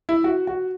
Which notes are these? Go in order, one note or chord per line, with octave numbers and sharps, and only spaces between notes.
E4
F#4
F#4